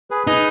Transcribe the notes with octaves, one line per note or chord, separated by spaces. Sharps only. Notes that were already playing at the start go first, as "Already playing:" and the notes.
G#4 B4
D#4 G#4 B4